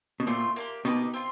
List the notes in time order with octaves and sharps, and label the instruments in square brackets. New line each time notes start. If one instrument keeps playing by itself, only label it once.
[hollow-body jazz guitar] B2
[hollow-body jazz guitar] A#2 [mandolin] A3 C4 F4
[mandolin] A#3 D4 G4
[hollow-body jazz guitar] B2 [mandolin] A#3 D#4 G4 B4
[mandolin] C4 F4